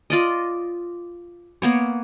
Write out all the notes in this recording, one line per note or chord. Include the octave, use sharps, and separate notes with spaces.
F4 D5 D#5
A#3 B3 C#5